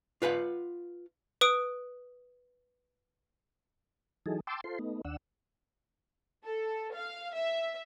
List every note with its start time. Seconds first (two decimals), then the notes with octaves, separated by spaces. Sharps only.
0.22 F4 B4 F5 F#5
1.41 B4 D#6 D7
4.26 E3 F#3 D#4 G#4 A4
4.47 G5 A5 C6 D6 E6
4.64 F4 A4 C5 C6
4.79 A3 B3 D#4
5.05 D#2 D4 F#5 E6
6.44 A4
6.94 F5
7.34 E5